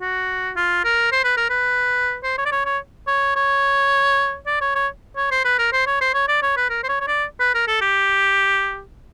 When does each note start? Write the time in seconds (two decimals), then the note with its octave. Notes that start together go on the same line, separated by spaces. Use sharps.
0.01 F#4
0.56 F4
0.84 A#4
1.12 C5
1.24 B4
1.37 A#4
1.50 B4
2.24 C5
2.38 C#5
2.46 D5
2.52 C#5
2.66 C#5
3.07 C#5
3.36 C#5
4.47 D5
4.61 C#5
4.75 C#5
5.17 C#5
5.31 C5
5.45 B4
5.59 A#4
5.72 C5
5.87 C#5
6.01 C5
6.14 C#5
6.28 D5
6.42 C#5
6.57 B4
6.70 A#4
6.83 C5
6.89 C#5
7.00 C#5
7.08 D5
7.40 B4
7.55 A#4
7.68 A4
7.81 G4